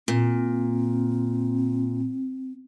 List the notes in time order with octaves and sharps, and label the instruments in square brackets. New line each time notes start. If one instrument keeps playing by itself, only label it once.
[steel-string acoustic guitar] A#2 [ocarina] C4